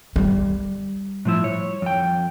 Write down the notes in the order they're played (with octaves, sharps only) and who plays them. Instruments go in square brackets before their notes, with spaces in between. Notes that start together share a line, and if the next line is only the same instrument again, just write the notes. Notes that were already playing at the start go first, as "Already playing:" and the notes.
[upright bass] G3
[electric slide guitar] A2 F3 E4
C#5
F2 G5